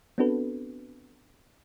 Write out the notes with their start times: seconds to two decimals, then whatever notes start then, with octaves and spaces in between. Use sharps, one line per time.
0.18 B3 C4 D4 F#4 A4 B4